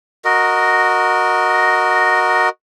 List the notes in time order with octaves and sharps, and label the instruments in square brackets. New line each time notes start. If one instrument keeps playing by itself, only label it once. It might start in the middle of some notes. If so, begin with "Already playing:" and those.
[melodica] F#4 A#4 D#5